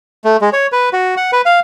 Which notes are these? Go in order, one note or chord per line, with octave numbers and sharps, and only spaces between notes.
A3
G#3
C#5
B4
F#4
F#5
B4
F5